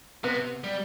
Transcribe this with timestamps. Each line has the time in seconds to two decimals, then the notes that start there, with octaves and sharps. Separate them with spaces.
0.24 C3 B3
0.64 G3